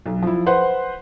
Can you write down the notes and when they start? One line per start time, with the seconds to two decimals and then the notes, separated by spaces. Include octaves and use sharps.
0.06 B1
0.22 F3 E4
0.46 B4 C5 F#5